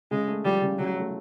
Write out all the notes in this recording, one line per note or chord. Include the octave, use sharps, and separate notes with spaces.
C#3 G#3
A3
F3 G3
C#3
C#3 F#3
A3